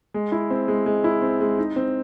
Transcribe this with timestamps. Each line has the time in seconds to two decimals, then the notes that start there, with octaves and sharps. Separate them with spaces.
0.14 G#3
0.32 E4
0.50 C4
0.68 G#3
0.86 G#3
1.04 E4
1.22 C4
1.41 G#3
1.58 D#4
1.76 C4